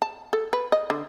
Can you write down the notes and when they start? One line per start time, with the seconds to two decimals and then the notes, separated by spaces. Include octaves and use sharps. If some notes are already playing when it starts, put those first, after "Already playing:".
0.02 A5
0.33 A4
0.53 B4
0.72 D#5
0.90 D3